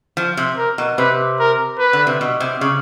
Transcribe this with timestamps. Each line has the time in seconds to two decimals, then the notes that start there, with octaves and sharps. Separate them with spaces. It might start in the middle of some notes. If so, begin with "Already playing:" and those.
0.17 F3
0.37 C3
0.58 A#4
0.78 B2
0.98 C3 B4
1.40 A#4
1.79 B4
1.93 D3
2.07 C3
2.21 B2
2.40 C3
2.61 C#3